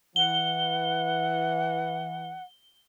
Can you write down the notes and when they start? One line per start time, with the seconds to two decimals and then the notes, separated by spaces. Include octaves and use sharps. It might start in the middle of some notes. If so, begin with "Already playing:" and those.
0.16 E3 F#5 G7